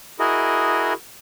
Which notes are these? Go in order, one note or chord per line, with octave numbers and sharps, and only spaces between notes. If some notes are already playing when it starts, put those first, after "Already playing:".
E4 F#4 G#4 A#4 D#5